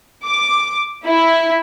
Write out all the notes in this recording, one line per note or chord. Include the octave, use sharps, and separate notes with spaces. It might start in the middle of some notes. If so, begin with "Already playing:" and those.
D6
E4